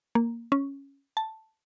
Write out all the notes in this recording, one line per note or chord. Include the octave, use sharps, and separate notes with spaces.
A#3
C#4
A5